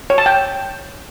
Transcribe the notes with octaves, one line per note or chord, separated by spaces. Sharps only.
C#5
A5
G5